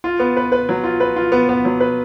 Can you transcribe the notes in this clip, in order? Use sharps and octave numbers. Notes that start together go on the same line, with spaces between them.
F4
B3
B4
B4
F#3
F4
B4
F4
B3
B3
F#3
B4